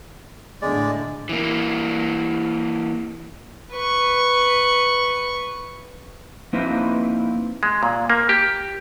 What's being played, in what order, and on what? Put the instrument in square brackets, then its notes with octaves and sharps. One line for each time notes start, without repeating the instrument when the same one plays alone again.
[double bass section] A2 D3 [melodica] G#3 D5
[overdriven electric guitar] E3 A#3
[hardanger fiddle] B4 C#6
[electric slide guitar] F3 A#3 C4 D#4 E4 B4
[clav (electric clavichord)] G#3
A#2
A#3
G4